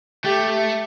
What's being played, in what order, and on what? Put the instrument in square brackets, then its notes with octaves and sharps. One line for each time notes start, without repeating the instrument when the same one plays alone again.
[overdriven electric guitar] A3 [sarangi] G4